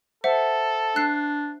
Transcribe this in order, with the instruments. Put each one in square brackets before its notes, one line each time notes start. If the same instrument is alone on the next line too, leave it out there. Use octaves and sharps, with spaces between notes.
[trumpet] A4 [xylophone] C5 E5 F#5
[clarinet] D4 [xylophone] F#6 C7